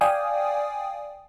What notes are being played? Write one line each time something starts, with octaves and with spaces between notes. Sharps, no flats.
D5 F5 G5 G#5 D#6